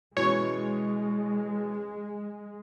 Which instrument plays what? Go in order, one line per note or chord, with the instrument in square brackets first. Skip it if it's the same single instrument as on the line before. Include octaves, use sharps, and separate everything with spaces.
[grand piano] B2 E3 C#4 [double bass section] G#3 [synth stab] C#5